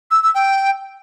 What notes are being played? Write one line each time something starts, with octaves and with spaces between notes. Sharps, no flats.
E6
E6
G5